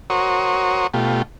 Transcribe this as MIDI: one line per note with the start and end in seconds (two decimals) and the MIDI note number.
0.10 0.87 66
0.10 0.87 70
0.10 0.87 72
0.10 0.87 73
0.10 0.87 85
0.10 0.87 87
0.94 1.22 47
0.94 1.22 57
0.94 1.22 65
0.94 1.22 67